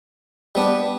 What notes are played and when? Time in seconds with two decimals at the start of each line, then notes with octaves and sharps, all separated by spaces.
0.55 G3 B3 D4